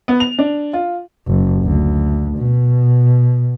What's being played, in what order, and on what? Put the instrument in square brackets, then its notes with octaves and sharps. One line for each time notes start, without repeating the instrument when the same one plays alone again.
[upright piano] B3
F7
D4
F4
[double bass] F#1
D2
B2